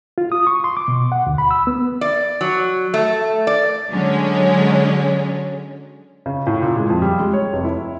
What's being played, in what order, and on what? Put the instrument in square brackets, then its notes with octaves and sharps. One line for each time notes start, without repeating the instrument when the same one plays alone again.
[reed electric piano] F4
D#6
C#6
C6
D6
B2
F#5
D2
B5
E6
B3
[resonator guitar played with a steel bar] D5
F#3
A3
D5
[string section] D3 F#3 G#3 C#4
[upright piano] C#3
A2
A#2
G#3
F2
G3
G#3
C#5
F1
E4